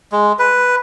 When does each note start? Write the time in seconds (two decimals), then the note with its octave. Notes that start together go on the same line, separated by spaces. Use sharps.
0.12 G#3
0.39 B4